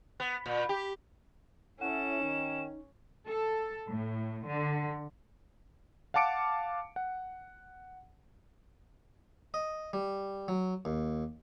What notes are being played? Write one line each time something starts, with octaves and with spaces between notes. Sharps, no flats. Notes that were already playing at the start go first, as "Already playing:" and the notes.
B3
A#2
G4
C#4 E4 A4 C#5 F#5 E7
D#3 D#4
A4
A2
D3
F5 F#5 A5 D6 C#7 D7
F#5
D#5
G3
F#3
D#2